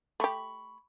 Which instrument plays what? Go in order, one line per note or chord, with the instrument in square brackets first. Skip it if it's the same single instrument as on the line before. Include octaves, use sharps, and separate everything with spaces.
[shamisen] A3 G4 [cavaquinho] B5 C#6